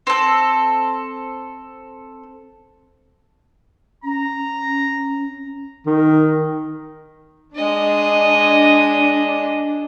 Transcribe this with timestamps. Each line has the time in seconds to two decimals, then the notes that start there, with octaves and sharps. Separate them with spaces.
0.07 C4 A4
4.04 C#4 A#5
5.86 D#3
7.56 G#3 D4 D#5